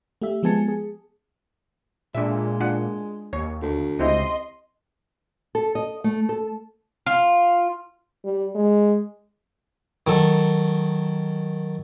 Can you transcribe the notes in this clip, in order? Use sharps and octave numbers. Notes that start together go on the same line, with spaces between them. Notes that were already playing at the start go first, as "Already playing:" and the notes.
A3 G4 E5
F3 G#3 B3 G#5 A5 C#7
G#4
A#2 G#3 D4 E5
D4 F4 F#5
D#2 C#5
D2
C#2 C4 E4 G4 D#5 C6
A4
D#5
A3
A4
F4
G3
G#3
D#3 F#3 A4